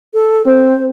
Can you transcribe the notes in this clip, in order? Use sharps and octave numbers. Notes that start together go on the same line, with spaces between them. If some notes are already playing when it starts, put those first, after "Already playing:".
A4
C4 C5